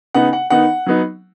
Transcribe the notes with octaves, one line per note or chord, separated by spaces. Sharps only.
C#3 B3 D#4 F#5
F#5
D#3 B3 D#4 F#5
F#3 B3 D#4